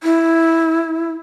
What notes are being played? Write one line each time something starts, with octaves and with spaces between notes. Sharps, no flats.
E4